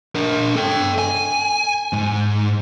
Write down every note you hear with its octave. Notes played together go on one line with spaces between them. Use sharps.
D4 A#4
A4 G5
G#5
G#2